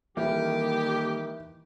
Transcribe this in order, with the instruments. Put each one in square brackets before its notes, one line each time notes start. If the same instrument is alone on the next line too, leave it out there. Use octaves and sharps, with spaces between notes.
[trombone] D#3 [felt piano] E3 [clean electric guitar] G3 A#3 [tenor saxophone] G4